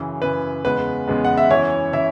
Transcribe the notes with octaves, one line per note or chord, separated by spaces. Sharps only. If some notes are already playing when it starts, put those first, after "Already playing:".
Already playing: F#2 C#3 E3
F#2 C#3 E3 B4
E2 C#3 G#3 B3 B4
E2 C#3 G#3 B3
F#5
E5
F#2 E3 C#4 E4 C#5
E3 C#4 E4 E5